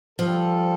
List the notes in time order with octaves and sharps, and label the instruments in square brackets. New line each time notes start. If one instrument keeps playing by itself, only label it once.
[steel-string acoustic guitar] F3 [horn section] G3 F4 A4